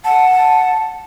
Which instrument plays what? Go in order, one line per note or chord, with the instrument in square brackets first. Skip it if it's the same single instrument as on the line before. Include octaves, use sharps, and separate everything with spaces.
[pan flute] F#5 [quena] A5